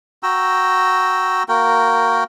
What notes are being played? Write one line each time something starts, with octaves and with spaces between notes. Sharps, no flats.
F#4 G5 A#5 E6
A#3 F#4 A#4 G5